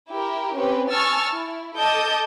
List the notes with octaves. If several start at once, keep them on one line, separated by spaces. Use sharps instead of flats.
E4 G4 A#4
C4 C#4 G4 B4
G#5 A5 C#6 E6 F6 A6
E4
A4 D#5 A5 D6 D#6 G6